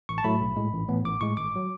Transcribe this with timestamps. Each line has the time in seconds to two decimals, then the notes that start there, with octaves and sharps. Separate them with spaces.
0.09 A1 C#6
0.18 A5
0.24 A2 F#3 A3 B5
0.41 B1
0.57 A2 G#3
0.73 A1
0.89 A2 E3 B3
1.05 A1 D6
1.21 A2 G#3 C#6
1.37 G#1 D6
1.55 F#3